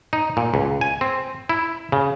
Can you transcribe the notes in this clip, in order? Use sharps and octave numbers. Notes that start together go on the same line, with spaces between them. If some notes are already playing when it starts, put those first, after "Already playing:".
D#4
A#2
C#2
G#5
C4
E4
C#3